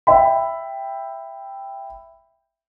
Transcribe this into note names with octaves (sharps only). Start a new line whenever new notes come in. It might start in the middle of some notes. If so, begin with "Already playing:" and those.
E5 G5 B5